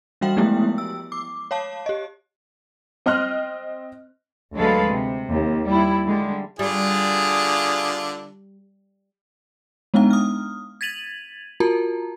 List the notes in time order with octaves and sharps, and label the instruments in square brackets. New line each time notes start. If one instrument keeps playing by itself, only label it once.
[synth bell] E3 G3 F#4 F5 G5 F#7
F3 G#3 A3 B3 E4 G4
E6
D6
C#5 F5 A5
G4 D#5
[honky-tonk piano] C4 D#5 C6 F6 F#6
[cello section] D2 F#3 G#3 A4 B4 F5
C3
D#2
G3 E4
D3 G3 G#3
[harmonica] D3 D4 F4 [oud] G3 [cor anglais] G#4
[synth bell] G#3 B3 D4 D#4 F5 A#5
D#6 F6
G#6 A6 B6 D#7 F7 F#7
F4 F#4 A#4 A5 A#5